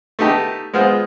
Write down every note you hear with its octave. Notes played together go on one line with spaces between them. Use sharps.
A3 B3 D#4 G4 A5
G#3 B3 F4 C5